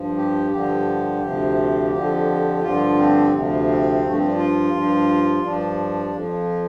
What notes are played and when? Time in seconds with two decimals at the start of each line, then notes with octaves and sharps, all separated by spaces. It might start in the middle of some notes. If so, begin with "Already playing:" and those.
Already playing: G2 F3
0.16 G4
0.51 G2 D3 F3 G4
1.21 D2 C3 F3
1.91 F2 D3 F3 G4
2.62 G2 D3 F3 F4
2.97 C4
3.32 D2 C3 F3
3.67 C4
4.02 G2 F3 A3
4.17 C4
4.27 D4
4.37 F4
4.72 G2 F3
5.42 G2 F3 D4
6.12 F2 F3